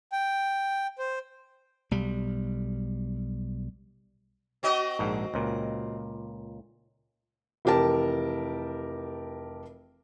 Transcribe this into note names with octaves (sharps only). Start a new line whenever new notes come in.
G5
C5
B1 G3
C4 F#4 D#5
A#1 G#2
C#2 A#2
F1 E3 G4 A#4 A5